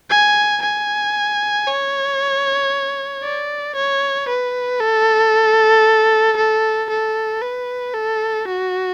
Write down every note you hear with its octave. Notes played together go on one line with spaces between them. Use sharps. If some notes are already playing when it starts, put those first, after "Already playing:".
G#5
G#5
C#5
D5
C#5
B4
A4
A4
A4
B4
A4
F#4